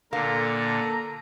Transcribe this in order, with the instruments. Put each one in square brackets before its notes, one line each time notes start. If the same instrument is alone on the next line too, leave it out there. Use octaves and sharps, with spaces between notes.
[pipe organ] A#2 D3 [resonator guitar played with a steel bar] A#3 [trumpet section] A4 [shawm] A#5